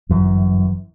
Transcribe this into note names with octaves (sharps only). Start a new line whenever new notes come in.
G1 F#2 E3